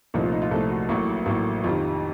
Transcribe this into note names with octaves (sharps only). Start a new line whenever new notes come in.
C2 A#2 F3 A3 D#4
F4
D#4
F4
C2 A#2 F3 A3 A4
F#4
A1 A2 F#3 A#3
A1 A2 F#3 A#3
F2 C3 D#3 F4